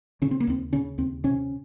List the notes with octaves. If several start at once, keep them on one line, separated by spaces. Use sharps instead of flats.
C#3 C#4
C4
A#3
D#2 C4
C#3 C#4
D#2 C4
C3 C#4